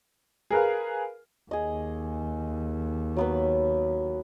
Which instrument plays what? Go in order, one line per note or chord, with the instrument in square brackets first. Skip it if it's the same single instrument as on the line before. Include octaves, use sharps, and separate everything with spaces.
[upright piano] G#4 A#4 B4 F5
[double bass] D#2 [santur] G#4 D#5
[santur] F#3 B3 B4